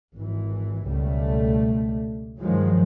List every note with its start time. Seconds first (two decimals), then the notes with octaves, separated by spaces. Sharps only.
0.15 G#1 E3
0.89 C#2 B2 G3 A3
2.39 G2 D#3 F3 F#3 G#3